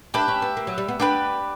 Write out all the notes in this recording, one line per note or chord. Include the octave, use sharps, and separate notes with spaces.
D4 G4 B4 E5
C#4
B3
A#3
F#3
G3
B3
B3 D4 G4 B4